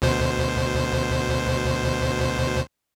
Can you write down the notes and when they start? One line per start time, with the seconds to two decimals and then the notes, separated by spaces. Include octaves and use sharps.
0.02 D2 B2 C5